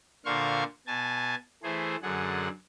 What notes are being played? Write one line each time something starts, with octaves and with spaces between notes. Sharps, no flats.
A#2 D3 C5 F5 C6 C#6
B2 G#5 A5
E3 A3 G#4 C5
F#2 D3 G#4 F#5